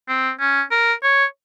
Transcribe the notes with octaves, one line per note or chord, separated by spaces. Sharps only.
C4
C#4
A#4
C#5